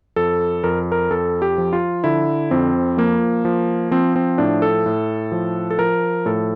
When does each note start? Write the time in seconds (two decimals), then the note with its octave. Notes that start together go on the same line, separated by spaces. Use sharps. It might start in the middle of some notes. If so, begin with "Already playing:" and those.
0.16 F2 A4
0.64 F2 A#4
0.92 A#4
1.11 F2 A4
1.42 G4
1.58 F3
1.73 F4
2.04 D3 E4
2.51 F2 C4
2.97 F3 A#3
3.45 F3
3.91 F3 C4
4.16 C4
4.38 A2 D4
4.62 A4
4.86 A2
5.32 F3
5.70 A4
5.79 F3 A#4
6.26 A2 A4